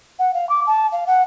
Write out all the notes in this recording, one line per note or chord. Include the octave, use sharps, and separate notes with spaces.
F#5
F5
D6
A5
F5
F#5